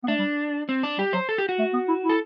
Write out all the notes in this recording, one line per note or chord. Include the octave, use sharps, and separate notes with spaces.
B3
A3 D4
G3
C4
D4
G3 G4
F#3 C5
A4
G4
F#4
A3
B3
E4
E4
A4